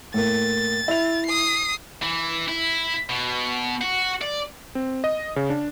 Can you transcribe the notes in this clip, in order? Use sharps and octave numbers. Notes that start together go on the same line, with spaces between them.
A2 A#3 A6
E4 F7
D#6 C7
E3
E4
B2
F#4
D5
C4
D#5
C#3
D4